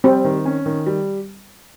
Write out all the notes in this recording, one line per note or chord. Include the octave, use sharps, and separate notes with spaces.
G3 C4
D#3
C#4
D#3
G3